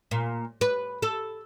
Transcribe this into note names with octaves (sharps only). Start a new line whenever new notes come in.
A#2
B4
A4